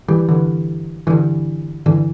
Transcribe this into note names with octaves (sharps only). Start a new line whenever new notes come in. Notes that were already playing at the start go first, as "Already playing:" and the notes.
E3 G3
G2 D3 E3
G2 D3 E3
G2 D3 E3